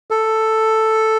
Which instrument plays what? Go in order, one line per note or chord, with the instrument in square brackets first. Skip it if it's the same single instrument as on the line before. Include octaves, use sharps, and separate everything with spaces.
[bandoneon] A4